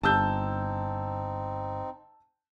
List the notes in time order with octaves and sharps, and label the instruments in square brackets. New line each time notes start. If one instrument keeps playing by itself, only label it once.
[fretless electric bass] G1 [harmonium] C4 D#4 [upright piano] A5 E6 G6